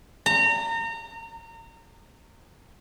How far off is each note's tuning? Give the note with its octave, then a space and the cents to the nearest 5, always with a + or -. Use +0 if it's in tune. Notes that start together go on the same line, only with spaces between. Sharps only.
A#5 -30